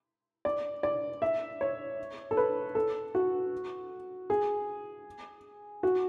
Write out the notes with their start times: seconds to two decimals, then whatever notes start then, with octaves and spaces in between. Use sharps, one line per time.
0.45 D5
0.83 D5
1.22 E5
1.61 C#5
2.31 A4
2.37 B4
2.75 A4
3.15 F#4
4.30 G#4
5.83 F#4